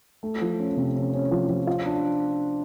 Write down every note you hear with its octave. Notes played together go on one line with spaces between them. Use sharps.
A3
F3
C#4
C3
C#4
C#4
F3
F3
F4
D4